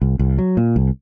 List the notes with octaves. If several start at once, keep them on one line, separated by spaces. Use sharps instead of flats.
C2
C2
F#3
A#2
C2